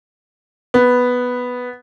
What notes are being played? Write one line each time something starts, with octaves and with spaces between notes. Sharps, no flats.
B3